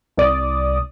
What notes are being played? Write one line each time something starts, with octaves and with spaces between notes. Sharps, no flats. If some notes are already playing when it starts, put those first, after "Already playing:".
C2 D5 D#6